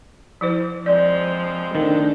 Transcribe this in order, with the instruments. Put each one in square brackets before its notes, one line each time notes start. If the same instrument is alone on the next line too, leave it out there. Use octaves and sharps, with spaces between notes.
[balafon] F3 E4 C5
[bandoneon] F2 G#3 G6 [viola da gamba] F3 [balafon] D5
[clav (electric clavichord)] D#3 [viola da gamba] A3 D4 [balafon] C5